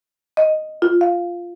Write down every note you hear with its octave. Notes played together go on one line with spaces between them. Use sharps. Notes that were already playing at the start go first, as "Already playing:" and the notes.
D#5
F4
F5